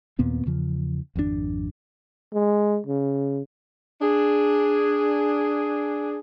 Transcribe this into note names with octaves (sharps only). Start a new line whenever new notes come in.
D#2 A#2 B3 C4
E2 C#3 F3
G#1 F2 B2 D4
G#3
C#3
D4 G#4